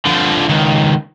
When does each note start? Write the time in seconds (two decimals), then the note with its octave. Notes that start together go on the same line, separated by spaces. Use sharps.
0.05 D3 F3
0.48 C#2 D#3